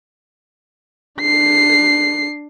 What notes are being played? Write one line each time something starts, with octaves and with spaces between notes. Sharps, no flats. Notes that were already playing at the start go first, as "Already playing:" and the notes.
D4 C7